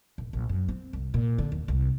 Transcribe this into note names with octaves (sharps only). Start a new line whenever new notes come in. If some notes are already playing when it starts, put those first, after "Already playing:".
D#1
A#1
F#2
C4
C2
A#2
D3
D#2
C2